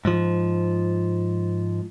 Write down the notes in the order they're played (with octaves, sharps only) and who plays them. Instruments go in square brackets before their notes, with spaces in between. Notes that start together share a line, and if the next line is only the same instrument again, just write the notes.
[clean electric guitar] G#2 F3